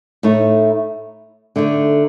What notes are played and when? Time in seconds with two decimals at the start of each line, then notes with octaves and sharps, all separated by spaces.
0.23 A2 A3 D#4
1.56 D3 A3 D#4